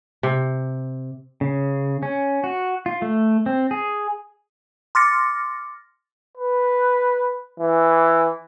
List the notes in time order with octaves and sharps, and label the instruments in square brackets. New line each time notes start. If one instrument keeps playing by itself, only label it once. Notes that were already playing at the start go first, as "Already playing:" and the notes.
[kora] C3
[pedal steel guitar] C#3
C#4
F#4
F4
A3
C4
G#4
[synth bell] C6 D6 F6 A6 A#6 C#7
[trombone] B4
E3